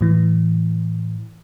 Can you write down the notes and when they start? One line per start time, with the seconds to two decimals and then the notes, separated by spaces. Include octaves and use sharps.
0.01 A2 E3